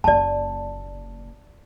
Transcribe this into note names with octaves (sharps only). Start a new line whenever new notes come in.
F#1 A#3 D5 A5